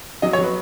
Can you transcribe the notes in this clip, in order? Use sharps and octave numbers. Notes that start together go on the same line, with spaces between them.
F#3 D#5
C#5
F#3
B4